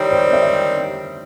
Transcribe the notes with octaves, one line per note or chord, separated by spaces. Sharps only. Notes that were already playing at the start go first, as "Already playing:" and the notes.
Already playing: D#3 G3 C4 C5 C#5
C5
E5